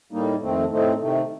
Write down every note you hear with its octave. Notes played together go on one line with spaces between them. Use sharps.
A2 G3 A#3 D#4
F2 D#3 A3 C4
A2 A3 C4 D#4
C3 D#3 A3